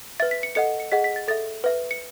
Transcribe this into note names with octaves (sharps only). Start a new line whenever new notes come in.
B4 E5 A6
B6
C#7
A4 D#5 F#5 C#7
C#7
G#4 D#5 F#5 B6
B6
A6
A4 E5 A6
B4 E5
C#7